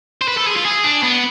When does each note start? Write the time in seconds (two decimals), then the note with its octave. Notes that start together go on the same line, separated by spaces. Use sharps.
0.21 C5
0.28 B4
0.37 A4
0.47 G#4
0.56 F4
0.65 G#4
0.84 D4
1.03 B3